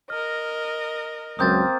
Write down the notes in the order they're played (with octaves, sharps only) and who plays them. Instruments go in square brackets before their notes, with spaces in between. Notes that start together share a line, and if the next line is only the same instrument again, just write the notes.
[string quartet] A#4 D#5 [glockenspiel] F6
[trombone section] C#2 F#2 [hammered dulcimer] A#3 C4 [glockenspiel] D#6 G6 A6